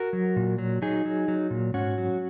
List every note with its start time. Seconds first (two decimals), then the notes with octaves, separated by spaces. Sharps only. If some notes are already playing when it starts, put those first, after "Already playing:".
Already playing: F#4 A#4
0.13 F#3
0.36 A#2
0.58 F#3
0.82 F#3 D#4 G#4
1.05 F#3
1.28 F#3
1.50 A#2
1.74 G#2 C#4 F#4
1.98 F#3